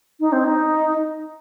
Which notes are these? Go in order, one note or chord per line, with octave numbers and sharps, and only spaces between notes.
D#4
C4
D#4